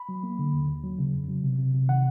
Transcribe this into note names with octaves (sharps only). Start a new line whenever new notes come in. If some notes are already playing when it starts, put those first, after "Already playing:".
Already playing: B5
F#3
A#3
D3
D#2
D#2
F#3
C#3
F2
F#3
C3
C3
C3
D#3 F#5